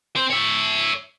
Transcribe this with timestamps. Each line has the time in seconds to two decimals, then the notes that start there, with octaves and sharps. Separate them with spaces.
0.16 C4 C5
0.30 C#5 E5